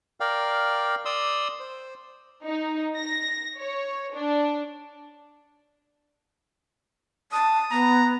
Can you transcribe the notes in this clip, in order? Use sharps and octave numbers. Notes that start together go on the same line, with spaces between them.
A#4 D5 F5 G5
D5 C6 D#6 E6
C5
D#4
A#6
C#5
D4
A5 D#6
B3 A#5